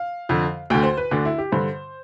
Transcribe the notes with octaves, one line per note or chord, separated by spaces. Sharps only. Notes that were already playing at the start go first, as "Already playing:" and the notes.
Already playing: F5
F2 D3
D2 D3 G5
C5
B4
D2 D3 D4
E4
G4
G2 D3 C5